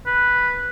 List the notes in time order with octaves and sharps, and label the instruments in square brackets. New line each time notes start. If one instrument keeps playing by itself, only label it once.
[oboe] B4